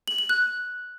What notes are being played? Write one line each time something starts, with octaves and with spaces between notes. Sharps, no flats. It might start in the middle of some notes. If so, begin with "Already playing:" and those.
F#7
F#7
F#6